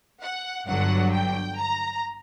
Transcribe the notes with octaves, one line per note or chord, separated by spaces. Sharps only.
F#5
G1 G2 D3 F#3 F#5
G5
A#5